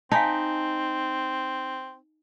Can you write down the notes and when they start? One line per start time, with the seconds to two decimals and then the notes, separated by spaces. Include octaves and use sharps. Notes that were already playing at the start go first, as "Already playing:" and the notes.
0.12 C4 D#4 F5 G#5 A5